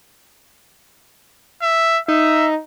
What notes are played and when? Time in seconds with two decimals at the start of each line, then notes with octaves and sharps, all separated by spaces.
1.62 E5
2.08 D#4 E5